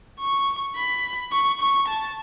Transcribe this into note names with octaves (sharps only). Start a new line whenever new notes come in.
C#6
B5
C#6
C#6
A5